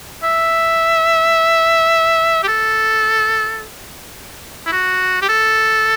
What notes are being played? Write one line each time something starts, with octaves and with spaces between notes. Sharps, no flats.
E5
G4
A4
E4
F#4
G4
A4